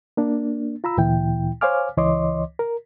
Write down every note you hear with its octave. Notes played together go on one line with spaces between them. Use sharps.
A#3 D4
F4 A#5 B5 E6
D2 A#2 E3 E4 G5
C5 C#5 F5 G#5 D6 F6
C#2 E3 C#5 D#5 C6 D6
A#4